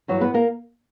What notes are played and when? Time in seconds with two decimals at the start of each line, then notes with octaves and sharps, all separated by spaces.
0.08 G2 E3 F#3 G3 F#4
0.21 B3 B4
0.34 A#3 A#4